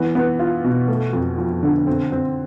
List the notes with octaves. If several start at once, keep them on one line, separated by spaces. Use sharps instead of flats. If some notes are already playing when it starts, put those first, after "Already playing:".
Already playing: E3 B3
B3
F4
B2
A3
F2
F3
D3
C4
C4